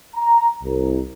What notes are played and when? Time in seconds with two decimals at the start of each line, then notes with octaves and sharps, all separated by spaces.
0.15 A#5
0.64 C2